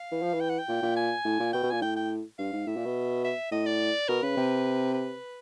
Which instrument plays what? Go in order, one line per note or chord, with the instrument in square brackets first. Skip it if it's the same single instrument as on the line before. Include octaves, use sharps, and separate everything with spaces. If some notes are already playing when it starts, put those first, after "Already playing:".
Already playing: [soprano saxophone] F5
[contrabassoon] E3
F3
E3
[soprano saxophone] G5
F#5
G5
[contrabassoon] A#2
A#2
[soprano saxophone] G#5
[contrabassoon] A2
A#2
[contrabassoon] B2 [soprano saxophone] G5
[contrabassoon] B2
[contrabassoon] A#2 [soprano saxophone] G#5
[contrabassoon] A2 [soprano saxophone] G5
[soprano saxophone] G5
[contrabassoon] G2 [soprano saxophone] F5
[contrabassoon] G#2
[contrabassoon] A2 [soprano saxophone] E5
[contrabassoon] A#2
B2
[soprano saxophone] E5
[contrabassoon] A2 [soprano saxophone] D#5
[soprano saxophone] D5
[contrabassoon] B2 [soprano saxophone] A#4
[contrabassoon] C#3 [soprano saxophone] B4
[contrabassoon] C3
[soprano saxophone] B4